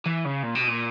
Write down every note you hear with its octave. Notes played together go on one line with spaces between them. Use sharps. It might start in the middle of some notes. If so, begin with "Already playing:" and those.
E3
C#3
A#2
B2
A#2